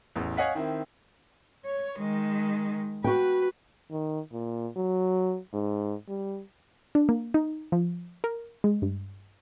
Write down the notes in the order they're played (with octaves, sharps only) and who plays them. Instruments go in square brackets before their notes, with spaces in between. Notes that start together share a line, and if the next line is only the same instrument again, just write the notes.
[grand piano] A1 E2
C#5 D#5 F5 F#5 G#5 B6
D#3 C4 E4
[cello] C#5
D#3 G#3
[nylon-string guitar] F#4 G5 [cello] B4
[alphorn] D#3
A#2
F#3
G#2
G3
[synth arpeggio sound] D4
A#3
D#4
F3
A#4
G#3
G2